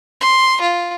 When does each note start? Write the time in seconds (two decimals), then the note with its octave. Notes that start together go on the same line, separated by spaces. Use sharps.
0.21 C6
0.61 F4